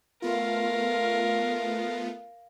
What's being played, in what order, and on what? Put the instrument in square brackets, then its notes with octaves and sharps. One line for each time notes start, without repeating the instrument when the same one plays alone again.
[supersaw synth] A3 B3 F4 [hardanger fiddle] A#4 F5